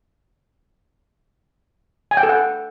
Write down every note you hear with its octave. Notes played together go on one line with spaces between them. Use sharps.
G#5
G5
A4
F#5